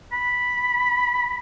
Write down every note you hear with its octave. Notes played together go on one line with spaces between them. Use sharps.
B5